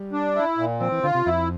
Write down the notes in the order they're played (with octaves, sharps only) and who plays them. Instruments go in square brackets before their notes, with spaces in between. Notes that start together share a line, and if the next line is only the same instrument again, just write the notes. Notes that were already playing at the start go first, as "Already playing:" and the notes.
Already playing: [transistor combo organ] G3
[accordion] D4
E4
A#2
[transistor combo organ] F3 [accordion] C4
[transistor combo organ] E3
[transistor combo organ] D3 [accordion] F4
[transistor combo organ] C3
[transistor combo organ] F2 [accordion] E4